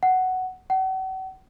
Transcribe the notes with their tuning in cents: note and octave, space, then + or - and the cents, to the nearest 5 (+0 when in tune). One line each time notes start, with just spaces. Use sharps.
F#5 +5
F#5 +40